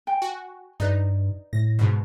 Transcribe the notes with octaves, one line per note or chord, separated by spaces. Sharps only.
G5 G#5
F#4
G2 D#4 B4 D5 D#5
A2 A#6
G#2 B2